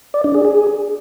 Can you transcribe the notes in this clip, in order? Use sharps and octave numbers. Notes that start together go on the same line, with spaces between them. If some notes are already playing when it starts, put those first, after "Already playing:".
D5
D4
G#4
G#4